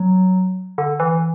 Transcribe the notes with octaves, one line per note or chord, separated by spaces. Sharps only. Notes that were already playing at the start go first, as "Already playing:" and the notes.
Already playing: F#3
D3
E3